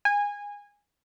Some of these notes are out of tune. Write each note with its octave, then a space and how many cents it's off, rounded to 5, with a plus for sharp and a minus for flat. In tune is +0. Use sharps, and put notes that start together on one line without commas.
G#5 -20